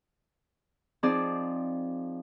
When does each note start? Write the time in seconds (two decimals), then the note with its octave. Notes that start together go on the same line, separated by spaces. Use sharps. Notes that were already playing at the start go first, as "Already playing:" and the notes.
1.03 F3 C4 D#4 G#4 D5